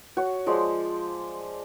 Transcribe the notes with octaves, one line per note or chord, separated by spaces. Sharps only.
F#4 C#5
F3 G#3 C5 D5